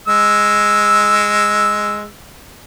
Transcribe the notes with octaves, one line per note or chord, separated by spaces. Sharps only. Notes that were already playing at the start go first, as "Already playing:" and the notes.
G#3 E6